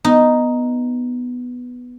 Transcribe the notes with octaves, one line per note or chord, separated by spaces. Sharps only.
B3 D#4